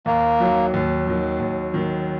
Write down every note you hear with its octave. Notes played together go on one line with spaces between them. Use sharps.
D#2 A#3
D#3 F#3
D#2
D#3 F#3
D#2
D#3 F#3